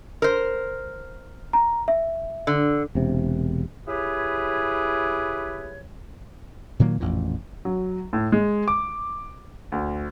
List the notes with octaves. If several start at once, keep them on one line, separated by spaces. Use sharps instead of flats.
A#4 C5
A#5
E5
D3
E1 C3
E4 G4 G#4 B4 C#5
A#2 D#3 F#3 A#3
A1 F2 A#2
F#3
A2
G#3
D6
D2